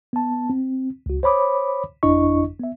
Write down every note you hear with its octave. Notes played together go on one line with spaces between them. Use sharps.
B3 A5
C4
C#2 F#4
C5 C#5 B5 D6 D#6
G1 F2 D4 E4 D#5 C#6
B3 E5